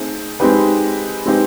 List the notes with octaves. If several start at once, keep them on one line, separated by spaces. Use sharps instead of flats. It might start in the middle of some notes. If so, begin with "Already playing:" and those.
Already playing: A3 C4 D#4 G#4
G#3 C4 D#4 G4 B4
G#3 C4 D#4 G4 B4